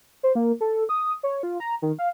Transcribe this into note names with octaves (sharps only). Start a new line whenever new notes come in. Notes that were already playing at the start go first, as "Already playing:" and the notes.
C5
A#3
A4
D#6
C#5
F4
A#5
D#3
F5